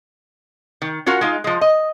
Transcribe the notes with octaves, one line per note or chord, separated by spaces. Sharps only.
D#3
C#4 F4 F#4 A#4
G#3 D#4 F4
F3 G#3
D#5